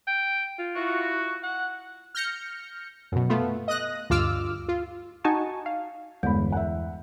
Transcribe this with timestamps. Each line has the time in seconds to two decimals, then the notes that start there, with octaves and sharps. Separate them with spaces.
0.07 G5
0.59 F4
0.76 E4 F#4
1.43 F#5
2.15 F6 G6 A#6 C#7
3.12 F#2 B2
3.30 A3 B3 F4
3.68 D#5 D#6 F#6 A#6
4.10 D2 G2 F4 D6 E6 F6
4.68 F4
5.24 D#4 F#4 G#5 A5 C#6
5.66 F5
6.23 G1 E2 G#3 B3 B5
6.52 E5 F#5